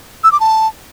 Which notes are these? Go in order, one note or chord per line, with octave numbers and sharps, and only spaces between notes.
E6
D6
A5